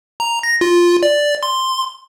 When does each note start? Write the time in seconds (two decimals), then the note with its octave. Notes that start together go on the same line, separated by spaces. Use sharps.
0.20 A#5
0.43 A#6
0.61 F4
1.03 D5
1.43 C6